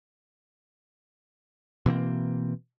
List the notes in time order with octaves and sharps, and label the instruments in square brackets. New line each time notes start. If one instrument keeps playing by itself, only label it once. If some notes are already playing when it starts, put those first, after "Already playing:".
[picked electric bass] B2 E3 A#3 C4